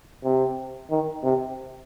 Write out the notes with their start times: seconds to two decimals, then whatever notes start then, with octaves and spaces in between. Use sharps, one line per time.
0.24 C3
0.90 D#3
1.24 C3